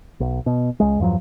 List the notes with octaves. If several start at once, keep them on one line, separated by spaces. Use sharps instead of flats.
B1
B2
C#2 G#3
E2 G2 F3 F#3